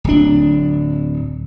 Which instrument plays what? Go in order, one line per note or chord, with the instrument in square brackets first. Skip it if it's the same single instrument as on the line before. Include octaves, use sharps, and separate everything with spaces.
[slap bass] D1 D4